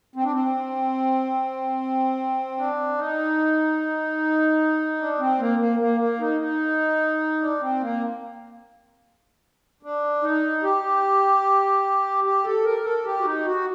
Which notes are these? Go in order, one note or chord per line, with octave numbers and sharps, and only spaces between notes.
C4
D4
C4
D4
D#4
D4
C4
A#3
A#3
A#3
A#3
D#4
D#4
D4
C4
A#3
D4
D#4
G4
G4
A4
A#4
A4
G4
F#4
D#4
F#4